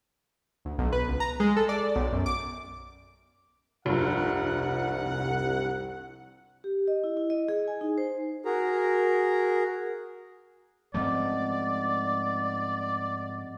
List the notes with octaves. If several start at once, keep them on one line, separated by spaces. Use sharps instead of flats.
D2
B1
B4
C#2
A#5
G#3
A4
D5
B1
F#2
D6
F1 C2 G2 F3 F#5
G4
D#5
E4
E4
D#5
G#4
G#5
D#4
C5
F#4 G#4 A#4 A#5
G#2 F3 A3 C4 D5 D#5 F#5